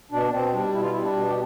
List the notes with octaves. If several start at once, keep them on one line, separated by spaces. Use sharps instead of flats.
B2 D4
B2 C4
G3 D4
B2 E4
F4
G3 E4
D4
B2
G4